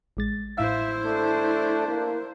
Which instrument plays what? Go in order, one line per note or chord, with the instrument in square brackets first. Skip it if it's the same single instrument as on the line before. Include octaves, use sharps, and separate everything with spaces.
[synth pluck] A1 G#3 A6
[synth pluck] A2 F5 [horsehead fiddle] E4 C5 [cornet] E5
[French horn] A3 [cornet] D4
[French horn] A#3